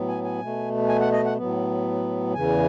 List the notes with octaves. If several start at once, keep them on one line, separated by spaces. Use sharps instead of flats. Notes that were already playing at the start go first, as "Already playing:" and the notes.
Already playing: A2 F#3 B3
G#5
G#5
B2 A3
G#5
F#5
D#5
F#5
A2 F#3 B3
E2 C#3 E3 G#5